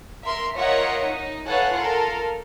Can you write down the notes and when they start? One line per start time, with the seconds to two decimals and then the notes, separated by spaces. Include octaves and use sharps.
0.23 A#4 E5 C6
0.56 F4 A#4 C#5 D#5 E5 F#5
1.08 D#4
1.47 A4 B4 C#5 F5 F#5 G#5
1.75 F4 A4 A#4